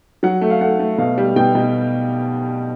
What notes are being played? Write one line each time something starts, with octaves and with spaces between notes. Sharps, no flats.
F#3 F#5
A3
F5
A3 F#5
A3
B2 F5
G3
B2 G5
B2